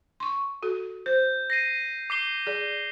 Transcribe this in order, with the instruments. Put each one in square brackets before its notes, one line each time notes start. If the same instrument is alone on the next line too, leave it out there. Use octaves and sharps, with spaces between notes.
[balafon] C6 C#6
F#4 A4
[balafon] C5 [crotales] G6
[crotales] A#6 C7 D#7
D6 C7 G7
[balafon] G#4 D5